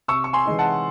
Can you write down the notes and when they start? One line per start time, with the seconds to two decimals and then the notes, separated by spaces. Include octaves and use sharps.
0.08 C3 C#6 E6
0.24 C#6
0.33 G#5 C6
0.46 E3 G#3 D#4
0.59 F#5 A5